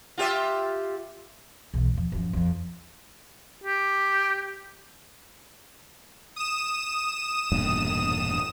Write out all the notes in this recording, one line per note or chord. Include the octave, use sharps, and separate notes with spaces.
F4 G4 E5
B1 E3
E2 F3
F#2 F3
F2 F3
G4
D#6 E7
E1 G2 A#2